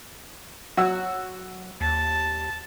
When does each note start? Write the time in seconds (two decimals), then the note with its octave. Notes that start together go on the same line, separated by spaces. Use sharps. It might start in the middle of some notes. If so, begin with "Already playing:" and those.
0.77 F#3 F#4 E6
1.81 D#2 A5